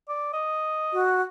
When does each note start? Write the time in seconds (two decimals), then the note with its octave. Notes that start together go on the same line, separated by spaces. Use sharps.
0.09 D5
0.33 D#5
0.93 F#4